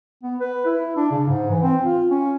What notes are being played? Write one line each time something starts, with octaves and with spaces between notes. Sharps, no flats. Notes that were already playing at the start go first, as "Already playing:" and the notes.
B3
B4
E4
D4
C#3
G#2
E3
C4
F4
C#4